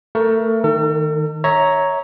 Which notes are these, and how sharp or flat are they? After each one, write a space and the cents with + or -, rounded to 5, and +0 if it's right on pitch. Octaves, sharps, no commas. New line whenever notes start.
A3 +25 A#4 +15
D#3 +0 A4 +45
C#5 +5 E5 -25 A#5 +0